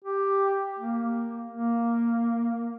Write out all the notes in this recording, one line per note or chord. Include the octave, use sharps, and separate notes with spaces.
G4
A#3
A#3